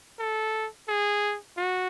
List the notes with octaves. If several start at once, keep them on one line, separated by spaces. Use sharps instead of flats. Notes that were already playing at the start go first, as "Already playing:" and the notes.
A4
G#4
F#4